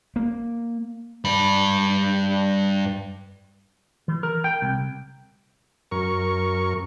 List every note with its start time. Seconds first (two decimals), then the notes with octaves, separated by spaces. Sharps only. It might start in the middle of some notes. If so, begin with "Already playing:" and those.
0.16 A#3
1.25 G2 B5
4.08 E3
4.23 A#4
4.44 G5
4.62 C2
5.91 F#2 A#4 C#6